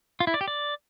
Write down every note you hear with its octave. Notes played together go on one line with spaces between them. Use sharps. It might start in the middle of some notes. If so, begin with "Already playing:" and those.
F4
E4
D5
G4
D5